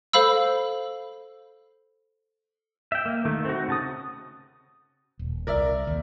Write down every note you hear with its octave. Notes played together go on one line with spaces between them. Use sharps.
A4 C5 F5 B5 E6
E5 G5
A#3
D#3 A3
C4 F#4
C#3 A5 D#6
D#1
C2 A#4 D5 E5
D#2